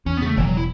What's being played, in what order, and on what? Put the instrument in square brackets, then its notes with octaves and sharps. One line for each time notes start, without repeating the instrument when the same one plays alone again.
[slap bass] E2 [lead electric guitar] C#4
[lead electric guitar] B3
[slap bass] C#3 [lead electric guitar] A3
[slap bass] E1 [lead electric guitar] E3
[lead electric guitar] F#3
E4